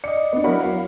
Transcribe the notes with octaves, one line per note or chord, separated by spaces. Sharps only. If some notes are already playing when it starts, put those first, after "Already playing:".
D5 D#5 C#7
B3 D4
F#3 E4 F#4 A#4 C#5 B5
F5